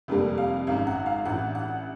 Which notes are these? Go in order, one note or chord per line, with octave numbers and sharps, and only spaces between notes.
F1 F2 D3 G3 A#3
F5
G#1 F#2 C#3 F5
F#5
F5
A1 G2 E3 F#5
F#5